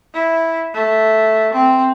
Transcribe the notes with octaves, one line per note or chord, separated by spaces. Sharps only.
E4
A3
C4